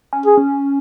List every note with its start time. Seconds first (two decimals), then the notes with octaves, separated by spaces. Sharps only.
0.13 C#4
0.25 G#4
0.37 C#4